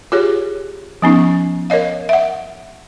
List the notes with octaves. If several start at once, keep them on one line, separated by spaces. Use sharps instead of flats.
F4 G4 G#4 C#5
F3 B3 C#4 D#4
A#4 C#5 D#5 F5
E5 F#5